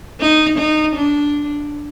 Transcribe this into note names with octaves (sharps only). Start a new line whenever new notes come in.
D#4
D#4
D4